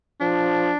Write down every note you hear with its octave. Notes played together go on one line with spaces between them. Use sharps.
F3 D4